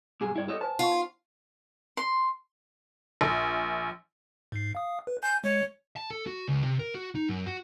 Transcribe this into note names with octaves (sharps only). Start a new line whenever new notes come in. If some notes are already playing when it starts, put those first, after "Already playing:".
B1 G2 G#4
G2 E4 D5 G5
A4 C#5 D#5
B4 C5 G#5 A5
F4 F#5 C#6
D#4
C6
A#1
G#2 C7
F5 D#6
B4
G#5 G6
G#3 C#5
A5
A4
F#4
C#2
C3
A#4
F#4
D#4
F#2
F#4